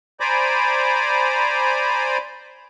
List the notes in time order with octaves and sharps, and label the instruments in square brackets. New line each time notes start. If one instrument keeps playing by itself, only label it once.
[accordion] C5 D5 G#5 A#5 B5 D6